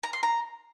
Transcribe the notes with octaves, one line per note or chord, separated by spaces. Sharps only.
A#5
C6
A#5